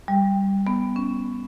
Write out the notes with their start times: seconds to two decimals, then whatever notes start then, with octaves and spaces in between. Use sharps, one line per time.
0.08 G3
0.67 B3
0.96 C#4